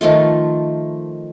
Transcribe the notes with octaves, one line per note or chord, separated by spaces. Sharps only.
D#3 F3 A3 F4